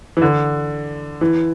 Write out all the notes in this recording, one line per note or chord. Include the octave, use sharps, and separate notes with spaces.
E3
D3
E3